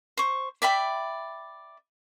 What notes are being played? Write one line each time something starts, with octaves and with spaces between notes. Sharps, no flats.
C5 C#6
D5 E5 G5 B5